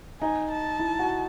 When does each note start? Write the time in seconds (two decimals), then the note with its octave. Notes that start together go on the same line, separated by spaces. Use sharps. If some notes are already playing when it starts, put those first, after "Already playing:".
0.21 D#4 G#5
0.51 A5
0.79 E4
0.99 F#4